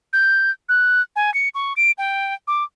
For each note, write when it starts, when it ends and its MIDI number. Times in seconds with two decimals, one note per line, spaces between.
0.13 0.51 91
0.69 1.02 90
1.16 1.33 80
1.34 1.49 97
1.55 1.73 85
1.77 1.91 98
1.98 2.34 79
2.47 2.64 86